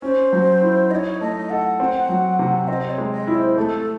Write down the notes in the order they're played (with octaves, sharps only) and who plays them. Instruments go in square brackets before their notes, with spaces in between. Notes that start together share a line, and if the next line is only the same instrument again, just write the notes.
[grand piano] C#4 [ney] C5
[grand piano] F#3
E4
[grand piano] D#4 [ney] D#5
[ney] C#5
[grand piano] A3 [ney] D#5
[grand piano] A4 [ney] F#5
[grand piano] C4
F#3
C3
[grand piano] C4 [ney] D#5
[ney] C#5
[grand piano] G#3
[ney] D#5
[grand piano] E4
[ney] C#5
C5
[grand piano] A3 [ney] A4